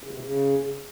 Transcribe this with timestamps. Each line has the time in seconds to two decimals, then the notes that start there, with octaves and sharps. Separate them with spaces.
0.03 C#3
0.13 C3
0.23 C#3